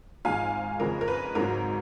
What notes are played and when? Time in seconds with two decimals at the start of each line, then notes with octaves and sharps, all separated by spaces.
0.25 G#1 G#2 F3 G#3 F5 G#5
0.80 F2 C#3 F3 G#3 A#4
1.01 A#4
1.08 B4
1.35 G#1 G#2 F#3 A#4